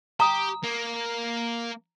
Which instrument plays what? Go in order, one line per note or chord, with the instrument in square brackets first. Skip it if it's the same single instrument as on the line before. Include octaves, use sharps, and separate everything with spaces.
[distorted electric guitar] G4 [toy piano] A#5 D#6
[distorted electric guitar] A#3